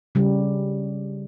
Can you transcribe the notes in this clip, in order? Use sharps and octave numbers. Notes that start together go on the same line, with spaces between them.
C#3 G3